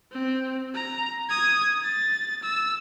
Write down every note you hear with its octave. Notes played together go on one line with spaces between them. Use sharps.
C4
A#5
D#6 G#6
A6
E6